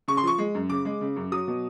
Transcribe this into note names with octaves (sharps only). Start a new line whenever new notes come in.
C#3 C#6
C6
F3 C#6
G#3
F#2
C#3 D6
G#3
C#3
F#2
F#3 D#6
B2